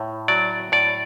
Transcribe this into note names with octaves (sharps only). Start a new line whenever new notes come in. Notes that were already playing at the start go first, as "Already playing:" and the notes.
Already playing: A2
F#3 D5
A2 D5